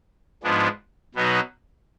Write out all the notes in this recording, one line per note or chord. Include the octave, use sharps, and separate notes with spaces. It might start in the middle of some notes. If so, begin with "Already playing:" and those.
G#2 F3 G#3 B3 D4
B2 F#3 B3 D#4 F#4